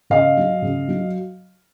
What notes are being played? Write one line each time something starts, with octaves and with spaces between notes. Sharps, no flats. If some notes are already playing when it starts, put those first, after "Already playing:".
C#3 D#5 F5
F#3
C#3
F#3